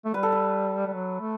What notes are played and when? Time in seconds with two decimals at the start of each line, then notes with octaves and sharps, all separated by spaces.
0.05 A3
0.14 G3 B4
0.23 A4
0.32 B4
0.87 G3
0.93 F#3
1.20 A3